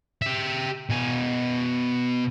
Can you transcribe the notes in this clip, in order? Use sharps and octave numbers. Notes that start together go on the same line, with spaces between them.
G4 E5
B2 G#5